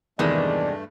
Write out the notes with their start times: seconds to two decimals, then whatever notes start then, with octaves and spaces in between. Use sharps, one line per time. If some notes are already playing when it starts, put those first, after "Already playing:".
0.19 E2 G2 C3 D#3 G#3 A3 D5